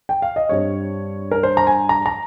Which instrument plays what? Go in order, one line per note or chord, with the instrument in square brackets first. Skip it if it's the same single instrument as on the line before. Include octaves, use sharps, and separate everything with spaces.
[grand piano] G5
F5
D#5
G2 G3 C4 C#5
A#4
C5
A#5
G#5
A#5
A#5